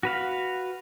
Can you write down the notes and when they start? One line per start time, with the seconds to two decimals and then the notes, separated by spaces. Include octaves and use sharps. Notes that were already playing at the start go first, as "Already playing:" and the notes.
0.03 F#4 B4 F5